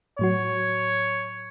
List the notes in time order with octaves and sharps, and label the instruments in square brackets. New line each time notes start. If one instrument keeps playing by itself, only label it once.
[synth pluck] A2 F#3 F#4 [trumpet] C#5